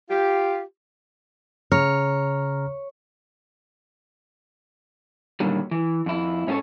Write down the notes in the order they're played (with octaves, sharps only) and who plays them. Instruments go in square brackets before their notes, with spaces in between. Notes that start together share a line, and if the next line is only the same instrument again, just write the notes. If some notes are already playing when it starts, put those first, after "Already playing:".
[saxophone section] F4 G4
[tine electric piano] C#3 A#5 F6 [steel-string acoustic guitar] C#5
[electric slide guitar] A#2 D3 D#3 F#3 G3
E3
F2 E4
G#2 C#4 E4 G#4 A4 C#5